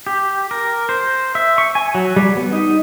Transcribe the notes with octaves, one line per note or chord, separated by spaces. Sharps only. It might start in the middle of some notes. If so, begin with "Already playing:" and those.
G4
A#4
C5
E5
C#6
G#5
F#3
G3
B3
D#4